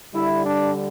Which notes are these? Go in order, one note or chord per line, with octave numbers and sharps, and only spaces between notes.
D3 G3 E4
D4